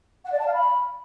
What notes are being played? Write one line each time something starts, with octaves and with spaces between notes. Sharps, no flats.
F#5
D5
A5
F5
B5